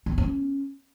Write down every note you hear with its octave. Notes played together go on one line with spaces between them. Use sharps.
G3
B3
C4
C#4